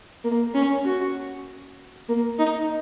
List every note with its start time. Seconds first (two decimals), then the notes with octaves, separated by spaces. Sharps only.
0.24 A#3
0.54 C#4
0.85 F#4
2.09 A#3
2.39 D#4